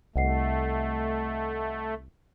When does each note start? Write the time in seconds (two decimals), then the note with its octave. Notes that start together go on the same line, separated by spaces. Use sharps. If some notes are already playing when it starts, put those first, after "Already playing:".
0.16 C2 A3 D#5 F#5 C7